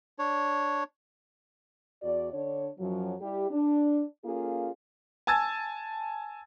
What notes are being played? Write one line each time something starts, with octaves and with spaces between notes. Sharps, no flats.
D4 C#5
E2 F#4 D5
D3 D4 C#5
F#2 F3 F#3
G3 E4 G4
D4
A#3 C#4 F4 G#4 A4
G#5 A5 E6 G#6 A6